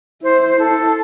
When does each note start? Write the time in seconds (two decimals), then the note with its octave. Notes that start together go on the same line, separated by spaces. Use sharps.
0.23 E4 C5
0.42 C5
0.59 A4